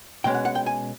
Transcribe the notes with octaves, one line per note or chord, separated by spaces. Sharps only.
B2 G#3 C#4 G5
F#5
F#5
G5
G#5